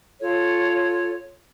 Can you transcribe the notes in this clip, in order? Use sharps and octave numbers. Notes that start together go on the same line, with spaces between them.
F4 A4 C#5